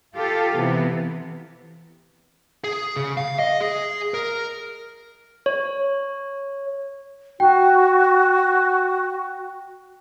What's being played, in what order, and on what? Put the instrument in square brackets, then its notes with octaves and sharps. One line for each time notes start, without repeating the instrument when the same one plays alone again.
[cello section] F4 G4 A4 F5
C3 E3 B3
[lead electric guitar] G#4
C#3
F5
D#5
G#4
A#4
[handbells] C#5
[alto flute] F#4 [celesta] G5